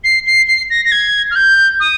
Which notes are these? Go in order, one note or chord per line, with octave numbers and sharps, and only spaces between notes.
C7
C7
C7
A#6
A#6
G#6
F6
G6
D#6